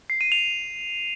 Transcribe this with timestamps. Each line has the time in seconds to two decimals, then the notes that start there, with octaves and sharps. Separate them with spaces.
0.10 C7
0.21 D#7
0.32 F7